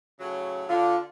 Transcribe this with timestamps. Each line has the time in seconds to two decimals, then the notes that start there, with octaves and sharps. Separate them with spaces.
0.20 A2 C#3 F#3
0.69 D3 F4